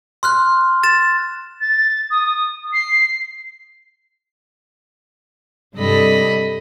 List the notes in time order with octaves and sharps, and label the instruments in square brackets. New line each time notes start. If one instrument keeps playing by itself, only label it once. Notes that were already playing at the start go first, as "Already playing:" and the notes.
[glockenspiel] C6 F6 F#6
A6 E7
[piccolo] A6
D#6
C7
[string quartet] G2 C3 G3 A4 D#5 B5